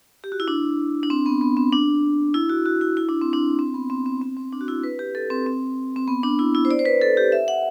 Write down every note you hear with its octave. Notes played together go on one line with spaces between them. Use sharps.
G4
F#4
E4
D4
D4
C4
B3
B3
C4
D4
E4
F#4
F#4
E4
E4
D4
C4
D4
C4
B3
C4
C4
C4
C4
D4
F#4
E4
B4
G4
A4
C4
C4
C4
B3
D4
E4
E4
C5
D5
C5
B4
A4
G4
E5
F#5